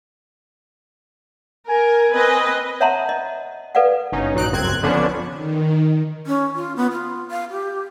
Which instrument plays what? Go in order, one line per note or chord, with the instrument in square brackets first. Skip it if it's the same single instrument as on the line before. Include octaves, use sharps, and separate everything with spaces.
[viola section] A#4 [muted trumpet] G#5
[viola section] C4 B4 D#5
[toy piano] C#5 E5 F#5 A5 A#5 C6
D#5
A4 B4 D5 F5 F#5
[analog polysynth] G1 C#4 D#4
A#1 F#3 D#4 F#6 D7
G1 C#2 F#2 C4 F#6 G#6
D3 F3 B3 C#4 D4
[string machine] D#3
[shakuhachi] C#4
F4
B3
F4
F5
G4